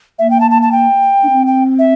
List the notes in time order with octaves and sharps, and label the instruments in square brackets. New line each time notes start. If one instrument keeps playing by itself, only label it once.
[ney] A#3 [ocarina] E5
[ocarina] G5
A5
A5
A5
G5
[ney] D4
C4
[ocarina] G5
E5